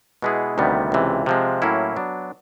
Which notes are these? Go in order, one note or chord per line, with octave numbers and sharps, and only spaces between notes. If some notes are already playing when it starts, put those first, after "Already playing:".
B2 G#3 B3 E4 G#4
D2 C3 D#3 G3 B3
C#2 C3 E3
C3 F3 G#3
A2 F#3 A#3 C#4 E4
F#3 B3 D4